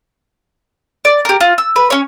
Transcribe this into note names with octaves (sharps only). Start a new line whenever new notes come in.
D5
G4 A#4
F4
E6
B4
C#4 C#5